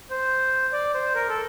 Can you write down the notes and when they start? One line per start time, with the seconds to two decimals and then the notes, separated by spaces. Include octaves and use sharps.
0.10 C5
0.73 D5
0.94 C5
1.15 A#4
1.29 A4